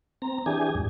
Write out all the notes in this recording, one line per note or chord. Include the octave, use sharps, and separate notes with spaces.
C4 A#5
E3 D4 G4 G#4 G#5
F2 G#2